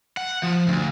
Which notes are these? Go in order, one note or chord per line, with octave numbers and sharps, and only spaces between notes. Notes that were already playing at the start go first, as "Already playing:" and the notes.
F#5
F3
D2